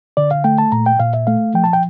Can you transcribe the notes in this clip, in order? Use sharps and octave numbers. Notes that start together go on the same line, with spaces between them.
D3 D5
F5
A3 G5
A5
A#2 A#5
G5
A#2 F5
E5
A3 F5
F3 G5
A5
G5